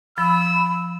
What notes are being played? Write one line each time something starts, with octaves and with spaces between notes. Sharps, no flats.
F3 B5 E6